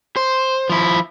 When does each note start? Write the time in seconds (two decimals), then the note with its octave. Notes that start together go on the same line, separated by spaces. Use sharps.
0.16 C5
0.70 F3 E4